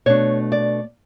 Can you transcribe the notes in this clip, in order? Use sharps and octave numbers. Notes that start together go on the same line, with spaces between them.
B2 A3 D4 C#5
D5